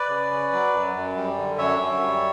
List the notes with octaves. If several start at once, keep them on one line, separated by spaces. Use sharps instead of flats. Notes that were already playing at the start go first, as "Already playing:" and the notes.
Already playing: B4 D5
C#3
C#4
F#3
F#2
F#2
G3
D3
F#2 C#5 E5
F#2
G3